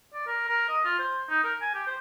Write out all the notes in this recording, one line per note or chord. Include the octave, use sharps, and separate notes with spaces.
D5
A#4
A#4
D#5
F4
C5
D#4
A#4
G#5
G4
C5